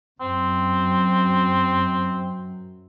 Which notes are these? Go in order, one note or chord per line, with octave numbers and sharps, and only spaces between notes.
F#2 C4